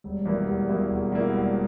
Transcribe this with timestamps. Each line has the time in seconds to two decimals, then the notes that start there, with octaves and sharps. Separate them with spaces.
0.04 E1 G3
0.19 G3
0.25 E2 B2 E3 A#3 E4
0.47 E1 G3
0.69 E2 B2 A#3 E4
0.90 E1
1.12 E2 B2 A#3 E4
1.34 E1 G3